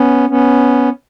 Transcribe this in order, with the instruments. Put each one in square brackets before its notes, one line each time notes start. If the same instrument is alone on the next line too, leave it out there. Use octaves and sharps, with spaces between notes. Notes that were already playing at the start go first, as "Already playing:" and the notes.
Already playing: [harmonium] B3 C#4
B3 C#4